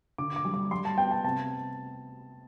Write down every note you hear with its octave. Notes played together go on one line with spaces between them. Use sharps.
D3 D6
D6
G3
D6
G3 C6
A5
B3 G5
A5
C3 A5